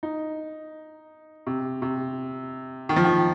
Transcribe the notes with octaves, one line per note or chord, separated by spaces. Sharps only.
D#4
C3
C3
D#3
F3
D#3